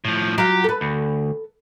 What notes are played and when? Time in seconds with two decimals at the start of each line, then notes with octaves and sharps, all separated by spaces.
0.05 A2 F3
0.38 F#3 F4 G4
0.64 A4 B4
0.81 D2